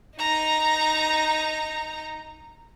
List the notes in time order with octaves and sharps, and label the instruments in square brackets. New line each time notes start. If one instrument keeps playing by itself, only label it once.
[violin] D#4 A#5